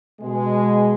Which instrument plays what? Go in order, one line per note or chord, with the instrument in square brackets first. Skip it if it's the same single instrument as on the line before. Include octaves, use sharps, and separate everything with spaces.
[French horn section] B2 G#3